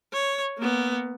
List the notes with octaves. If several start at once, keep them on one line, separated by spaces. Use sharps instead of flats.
C#5
A#3 B3